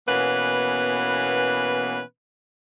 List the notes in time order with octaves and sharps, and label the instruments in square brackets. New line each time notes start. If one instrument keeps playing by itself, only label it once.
[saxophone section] B2 E3 A#3 B3 C#4 B4